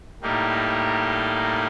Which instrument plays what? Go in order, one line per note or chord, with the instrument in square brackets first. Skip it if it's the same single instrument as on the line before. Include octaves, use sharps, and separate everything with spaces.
[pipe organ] A2 G3 A#3 D#4 G4